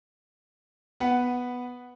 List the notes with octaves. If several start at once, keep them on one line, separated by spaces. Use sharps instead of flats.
B3 B4 F#5